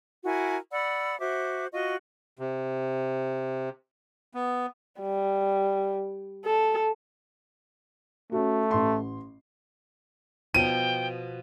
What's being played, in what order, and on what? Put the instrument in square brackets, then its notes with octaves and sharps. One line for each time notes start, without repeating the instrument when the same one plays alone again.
[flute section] E4 F#4 A#4 G#5
D5 F#5 B5 E6
F#4 C5 E5 D6
F4 F#4 D#5 C#6
[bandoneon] C3
B3
[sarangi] G3
A4
[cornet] A3 [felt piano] C#4 F#4
[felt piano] A1 C6
[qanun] B2 F3 [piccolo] G5 [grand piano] D#7